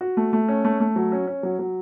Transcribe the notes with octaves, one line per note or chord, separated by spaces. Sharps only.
F#4
A3
A3
C#4
A3
A3
F#3
C#4
C#4
F#3
F#3